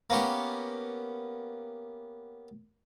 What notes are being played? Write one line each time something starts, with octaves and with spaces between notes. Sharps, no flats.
A#3 B3 C#4 G4